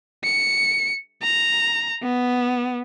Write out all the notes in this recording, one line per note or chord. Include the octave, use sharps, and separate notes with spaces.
C#7
A#5
B3